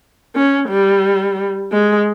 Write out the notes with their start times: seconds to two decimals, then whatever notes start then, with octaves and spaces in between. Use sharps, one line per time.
0.35 C#4
0.69 G3
1.72 G#3